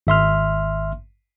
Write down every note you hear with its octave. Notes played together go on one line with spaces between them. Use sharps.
G#1 E5 C6 F6